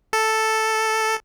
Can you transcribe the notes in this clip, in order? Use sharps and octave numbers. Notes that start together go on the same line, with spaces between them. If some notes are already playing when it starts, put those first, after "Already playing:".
A4